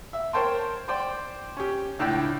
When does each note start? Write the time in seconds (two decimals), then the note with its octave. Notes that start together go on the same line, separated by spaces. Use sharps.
0.13 E5
0.33 A#4 C5 C#5 G5 A5 C6
0.88 C5 D5 G5 C6
1.57 C#4 G4
1.99 C#2 A2 D4 G5